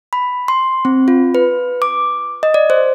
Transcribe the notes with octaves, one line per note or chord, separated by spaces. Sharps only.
B5
C6
C4
F4
B4
D6
D#5
D5
C5